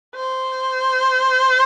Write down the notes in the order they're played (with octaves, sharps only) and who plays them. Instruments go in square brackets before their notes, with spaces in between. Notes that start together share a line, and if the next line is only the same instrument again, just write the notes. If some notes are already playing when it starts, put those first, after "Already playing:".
[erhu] C5